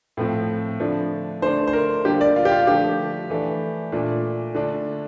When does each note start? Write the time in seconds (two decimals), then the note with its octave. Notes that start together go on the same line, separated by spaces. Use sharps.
0.17 A2 F3 A3 C4
0.80 D3 F3 A3 D4
1.42 D3 A3 D4 C5
1.68 C5
1.73 A#4
2.05 D3 G3 A#3 D4 G4
2.21 D5
2.36 F4
2.45 G4
2.52 F4
2.67 D3 F3 A3 D4 G4
3.30 E3 A3 D4
3.92 A#2 A3 D4
4.55 D3 A3 D4